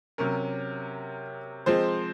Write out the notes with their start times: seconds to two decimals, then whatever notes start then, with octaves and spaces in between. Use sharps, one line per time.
0.18 C3 F#3 C#4 A#4
1.66 F3 G#3 C4 C5